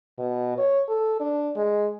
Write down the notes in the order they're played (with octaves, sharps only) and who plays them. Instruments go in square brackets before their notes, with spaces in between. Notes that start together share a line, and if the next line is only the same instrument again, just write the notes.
[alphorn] B2
C#5
A4
D4
G#3